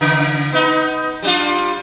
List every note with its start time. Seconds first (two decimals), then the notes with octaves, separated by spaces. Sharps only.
0.01 C#3
0.52 B3 D#4
1.23 G3 D4 F4